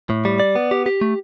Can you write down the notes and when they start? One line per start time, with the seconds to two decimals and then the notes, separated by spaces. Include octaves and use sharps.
0.10 A2
0.25 G3
0.40 D5
0.55 B3
0.71 G4
0.86 G4
1.01 A3